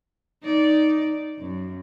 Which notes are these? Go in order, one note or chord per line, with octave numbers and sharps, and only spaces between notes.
D#4 D5
F#2